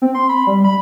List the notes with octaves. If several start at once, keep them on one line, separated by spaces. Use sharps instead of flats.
C4
C6
B5
G3
B5